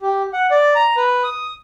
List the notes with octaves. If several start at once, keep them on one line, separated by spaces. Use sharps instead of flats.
G4
F#5
D5
A#5
B4
D#6